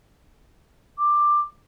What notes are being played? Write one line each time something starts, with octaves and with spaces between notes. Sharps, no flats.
D6